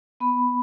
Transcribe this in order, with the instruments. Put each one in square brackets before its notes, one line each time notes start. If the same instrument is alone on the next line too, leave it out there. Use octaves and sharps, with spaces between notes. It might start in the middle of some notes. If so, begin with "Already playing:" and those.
[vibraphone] B3 B5